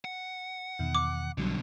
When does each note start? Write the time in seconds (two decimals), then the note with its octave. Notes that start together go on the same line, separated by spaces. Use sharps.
0.05 F#5
0.79 E2 B2 D#3
0.95 D6
1.38 B1 B2 D3 F#3 G3